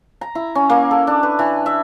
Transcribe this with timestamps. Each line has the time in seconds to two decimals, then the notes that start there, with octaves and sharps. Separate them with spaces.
0.21 A#5
0.35 E4
0.55 C#4
0.69 A#3
0.91 A4
1.07 D4
1.23 B4
1.39 E3
1.66 E5